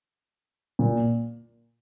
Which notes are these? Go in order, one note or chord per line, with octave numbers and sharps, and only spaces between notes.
A#2